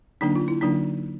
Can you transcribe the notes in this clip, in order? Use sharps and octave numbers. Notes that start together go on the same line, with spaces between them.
D3 F#3 A#3 D4 D#4
F4
E4
D3 F#3 A#3 D4 D#4